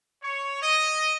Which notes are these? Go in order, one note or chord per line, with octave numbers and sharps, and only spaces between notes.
C#5
D#5